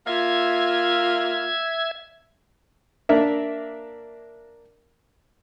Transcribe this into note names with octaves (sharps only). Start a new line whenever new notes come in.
A#3 F4 E5 G#6
A#3 D4 A#4 E5